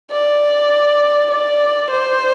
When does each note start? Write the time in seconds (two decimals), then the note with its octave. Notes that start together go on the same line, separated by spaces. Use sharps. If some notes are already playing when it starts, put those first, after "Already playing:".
0.11 D5
1.31 D5
1.90 C5